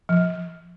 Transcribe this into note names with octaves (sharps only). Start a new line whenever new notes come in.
F3